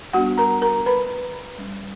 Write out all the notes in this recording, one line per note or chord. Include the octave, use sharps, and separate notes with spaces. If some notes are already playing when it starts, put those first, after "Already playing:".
G3 B3 D4 F#4 F#5
A#4 A#5
A#4 A#5
B4 B5
G3 C#4